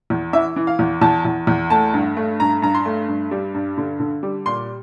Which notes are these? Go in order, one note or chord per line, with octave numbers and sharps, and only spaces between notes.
E2
E3 E5
E3
F5
E2
E2 A5
E2
E2
A3 A5
G2
A3
G2 A#5
G2 A#5
C6
A3
G2
G3
G2
D3
D3
G3
A#2 C6